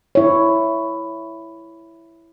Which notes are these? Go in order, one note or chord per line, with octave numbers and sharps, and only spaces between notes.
E4 C#5